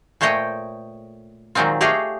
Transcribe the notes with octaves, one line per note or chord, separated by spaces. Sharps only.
A#2 A3 C5 C#5 D#5 G5
A#2 D#3 F#3 G#3 C4 F4
A3 G4 G#4 C#5 D#5 F5